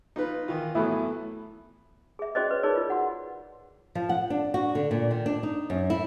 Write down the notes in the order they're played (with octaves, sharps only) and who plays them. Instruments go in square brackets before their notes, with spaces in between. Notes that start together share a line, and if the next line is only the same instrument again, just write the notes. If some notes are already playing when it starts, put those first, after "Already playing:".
[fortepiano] D#4 F4 B4
D#3 E3 F4
[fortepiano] A2 E3 F#3 [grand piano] A3 B3 E4
[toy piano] G#4 E5
C#4 F#4 G#4 C5 D5 D#5
B4 C#5
D#4 G#4 A#4 C#5 D5
F4
F#4 F#5
[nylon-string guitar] F3
F#5
D4
F#4
D3
A#2
D#3
D4
D#4
F#2
E4